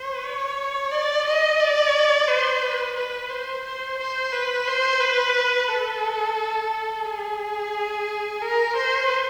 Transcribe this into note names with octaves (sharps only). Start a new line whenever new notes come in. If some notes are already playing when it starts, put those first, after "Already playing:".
Already playing: C5
C#5
D5
D#5
D5
C5
B4
B4
C5
C5
C5
B4
C5
B4
A4
G#4
A#4
C5